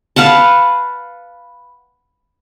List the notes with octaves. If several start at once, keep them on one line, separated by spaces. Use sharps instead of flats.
B4 F5 F#5 A5